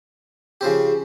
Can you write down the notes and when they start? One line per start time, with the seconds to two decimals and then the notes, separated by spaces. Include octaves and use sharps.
0.61 C#3 F3 C4 G4